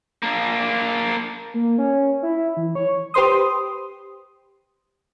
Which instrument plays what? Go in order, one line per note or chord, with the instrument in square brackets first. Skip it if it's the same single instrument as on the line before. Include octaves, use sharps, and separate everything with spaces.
[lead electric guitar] A#3 D4
[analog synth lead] A#3
C#4
E4
E3
C#5
[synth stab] G4 B4 C5 C6 D#6